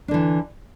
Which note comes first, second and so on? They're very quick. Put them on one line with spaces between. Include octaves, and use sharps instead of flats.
D4 D3 E3